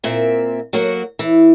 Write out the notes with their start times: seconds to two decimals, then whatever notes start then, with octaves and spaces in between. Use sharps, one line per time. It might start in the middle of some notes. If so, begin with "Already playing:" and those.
0.04 A#2 A#3 C4 E5
0.73 F#3 A#3 F#4
1.19 E3